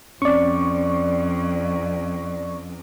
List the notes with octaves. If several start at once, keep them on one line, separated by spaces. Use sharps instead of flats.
F2 C4 C#4 D5 C#6